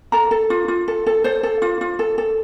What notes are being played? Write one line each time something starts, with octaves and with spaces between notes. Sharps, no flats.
A4 A#5
A4
F4
F4
A4
A4
A4 C5
A4
F4
F4
A4
A4